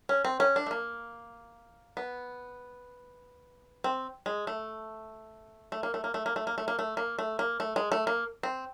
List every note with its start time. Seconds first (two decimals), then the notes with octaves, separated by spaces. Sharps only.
0.09 C#4
0.25 C4
0.40 C#4
0.56 D4
0.66 A3
0.71 A#3
1.97 B3
3.84 C4
4.26 G#3
4.47 A3
5.72 A3
5.83 A#3
5.94 A3
6.04 A#3
6.14 A3
6.26 A#3
6.36 A3
6.47 A#3
6.58 A3
6.68 A#3
6.79 A3
6.97 A#3
7.19 A3
7.39 A#3
7.60 A3
7.76 G#3
7.92 A3
8.07 A#3
8.43 C4